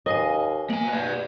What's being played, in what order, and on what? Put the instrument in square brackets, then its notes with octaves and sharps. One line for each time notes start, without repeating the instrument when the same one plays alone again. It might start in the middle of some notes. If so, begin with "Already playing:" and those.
[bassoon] D#2 [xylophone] B4 F5 G#5 [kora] D#5
[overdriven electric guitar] A#3 G#5 [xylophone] F#7
[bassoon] B2 [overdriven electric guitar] B4 D5